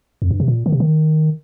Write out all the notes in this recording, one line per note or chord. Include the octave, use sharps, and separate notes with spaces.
F2
G2
C3
A#2
D#3
C3
D#3